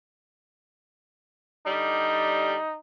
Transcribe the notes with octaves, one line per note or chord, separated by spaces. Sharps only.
D3 G3 D#4